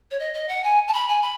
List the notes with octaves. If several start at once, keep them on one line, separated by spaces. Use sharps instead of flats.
C#5
D#5
D#5
F#5
G#5
A5
B5
G#5
B5